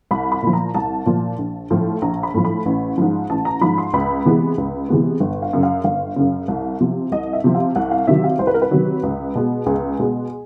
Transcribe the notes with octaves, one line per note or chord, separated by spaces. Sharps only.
C2 B5
B5
A#2 F3
A#5
C2 A5
A#2 F3
A#1
A2 F3
A#1 A#5
B5
A2 F3
B5
A1
G#2 F3
A1 A5
A#5
G#2 F3 B5
C6
C#2 B5
C3 E3 G#3 B3
C#2
C3 E3 G#3 B3
G1
F5
F#2 C#3
F5
G1 F5
F#2 C#3
C2
C3 F3
C2 D#5
E5
C3 F3
F5
C2 F#5
F5
C3 D#3 F#3 E5
F5
C2 C5
B4
A#4
B4
C3 D#3 F#3
C#2
B2 G#3 B3
C#2 G#4
B2 G#3 B3